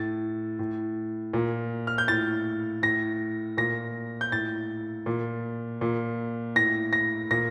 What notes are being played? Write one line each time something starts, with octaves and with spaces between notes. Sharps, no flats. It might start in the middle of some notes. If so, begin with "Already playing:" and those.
Already playing: A2 A6
A2
A#2
F6
G6
A2 A6
A2 A#6
A#2 A#6
G6
A2 A6
A#2
A#2
A2 A#6
A#6
A#2 A#6